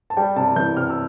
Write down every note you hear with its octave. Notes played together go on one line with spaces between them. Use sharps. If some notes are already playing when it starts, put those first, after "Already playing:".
A5
G3 G5
C3 A5
E3 G6
C3 F6
E6